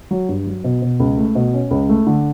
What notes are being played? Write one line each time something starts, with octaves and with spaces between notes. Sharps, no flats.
F#3
G2
F#3
B2
B2
C#2
A3
B2
C#4
C#2
A3
D3